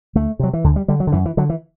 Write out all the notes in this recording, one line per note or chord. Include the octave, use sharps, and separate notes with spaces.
D2 A3
C3 F#3
E3
D2 D3
G3
D3 G3
F#3
D3
F#2 E3
E3
D3 F#3
E3